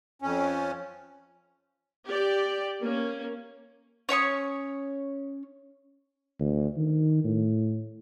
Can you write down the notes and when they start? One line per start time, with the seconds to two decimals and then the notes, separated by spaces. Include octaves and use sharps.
0.22 F2 C#4
2.08 G4 D5
2.81 A#3 C#4
4.09 C#4 C#5 C#6 D#6
6.39 D2
6.77 D#3
7.24 A2